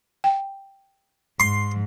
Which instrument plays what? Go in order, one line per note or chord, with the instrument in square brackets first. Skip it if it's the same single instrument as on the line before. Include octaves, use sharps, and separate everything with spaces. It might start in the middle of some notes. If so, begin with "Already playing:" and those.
[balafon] G5
[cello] G#2 [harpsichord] C6